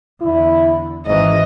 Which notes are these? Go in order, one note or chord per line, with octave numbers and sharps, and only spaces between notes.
E2 D3 E4
G#1 G#2 E3 D#5